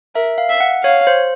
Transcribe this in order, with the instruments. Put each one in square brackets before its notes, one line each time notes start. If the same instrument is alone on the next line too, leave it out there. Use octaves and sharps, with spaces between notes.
[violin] A#4 [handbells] E5
[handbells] F5
[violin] E5
[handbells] F#5
[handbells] C#5 [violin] F5
[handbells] C5